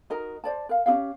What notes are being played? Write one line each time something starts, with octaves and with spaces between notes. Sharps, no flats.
D#4 F#4 A#4 D#5
C5 D5 A5
A#4 F5
C#4 D#4 G4 F5